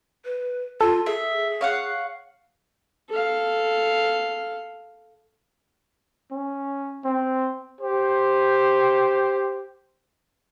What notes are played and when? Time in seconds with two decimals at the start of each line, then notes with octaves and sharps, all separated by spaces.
0.25 B4
0.81 F4 A4
1.06 G#4 E5
1.61 C#5 F5 F#5
3.10 A4 F5
6.31 C#4
7.04 C4
7.80 G4 C5